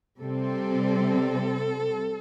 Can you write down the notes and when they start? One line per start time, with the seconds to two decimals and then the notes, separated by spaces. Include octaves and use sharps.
0.19 C3 G3 C4 A4